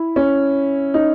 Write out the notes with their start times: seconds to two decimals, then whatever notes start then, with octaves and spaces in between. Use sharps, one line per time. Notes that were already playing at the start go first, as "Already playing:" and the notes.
Already playing: E4
0.16 C#4
0.94 D#4